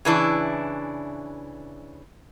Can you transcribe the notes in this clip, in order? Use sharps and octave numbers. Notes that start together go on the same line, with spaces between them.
C#3 E3 D4 E4